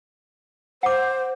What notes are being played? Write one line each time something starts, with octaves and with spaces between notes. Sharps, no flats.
C5 F#5 D6